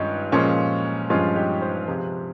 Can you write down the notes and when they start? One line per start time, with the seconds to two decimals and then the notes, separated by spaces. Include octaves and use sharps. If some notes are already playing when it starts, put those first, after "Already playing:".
Already playing: G2 D#3 G#3 C#4 D#4 F4
0.32 A#2 F3 G#3 C#4
1.10 G2 F3 G#3 C#4 F4
1.36 D#4 G4
1.62 C5 D#5
1.88 C3 F3 G#3